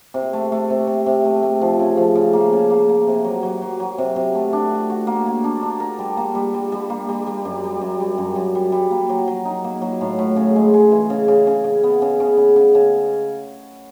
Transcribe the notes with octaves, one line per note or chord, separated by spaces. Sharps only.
C3
A3
A3
C3
C3
C3
A3
A3
F3
C#3
F3
C#3
A#3
C#3
A#3
A#3
C3
F#3
F#3
F#3
F#3
C3
C3
A3
D4
F#4
F#4
A#3
A#3
D4
D4
A#4
G3
A#3
G3
G3
G3
A#3
G3
G3
F#2
G3
F#2
G3
F#2
F#2
G3
G3
A#3
F#3
F#3
D#4
A#3
F#3
A2
A2
C#3
G#3
G#3
E3
C#3
C#3
C#3
C#3
B3
C#3
C#3
C#3
C#3
C#3